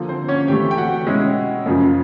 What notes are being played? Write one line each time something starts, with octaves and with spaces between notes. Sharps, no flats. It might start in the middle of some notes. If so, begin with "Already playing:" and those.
Already playing: D3 F3 A#3
C4 C5
C#4 C#5
C3 E3 A3 G4 G5
G5
F#4 F#5
B2 G#3 C#4 E4
F#2 C#3 F3